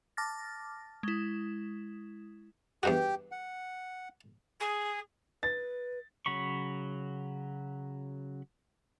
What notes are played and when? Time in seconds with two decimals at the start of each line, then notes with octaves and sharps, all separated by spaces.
0.17 A5 D6 F6 A6 A#6
1.03 G#3 E4
2.83 E2 G2 F#4 G4 G5
3.32 F#5
4.60 G#4
5.43 B4 A6
6.26 C#3 F#3 B5 C#6